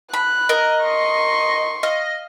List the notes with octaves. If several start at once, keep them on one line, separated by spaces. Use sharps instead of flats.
B5 F#6
A#4 D#5
C6 C#6
D#5 F5